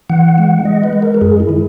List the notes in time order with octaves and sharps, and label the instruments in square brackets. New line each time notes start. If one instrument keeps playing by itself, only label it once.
[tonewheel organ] E3 F#5
G#3
G#3 D#5
B4
G#3
A#4
A#4
F#2 G#4
E4
D#3